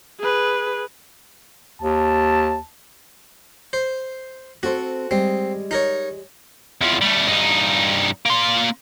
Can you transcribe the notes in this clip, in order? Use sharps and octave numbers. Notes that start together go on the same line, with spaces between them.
G#4 B4
D#2 A5
C5
C4 F#4 A4 C5
G3 G#3 C4 D#5
D#4 A#4 C#5
E2 F3
G3 A3
G2 D#4
A#3 C6